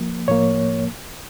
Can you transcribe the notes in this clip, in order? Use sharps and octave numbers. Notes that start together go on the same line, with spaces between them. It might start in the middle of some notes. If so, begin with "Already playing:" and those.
Already playing: F3 A#3
A2 F3 A#3 C#5